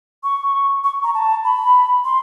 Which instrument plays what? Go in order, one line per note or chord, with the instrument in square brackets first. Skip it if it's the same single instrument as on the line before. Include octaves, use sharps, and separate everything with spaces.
[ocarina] C#6
C#6
A#5
A5
B5
C6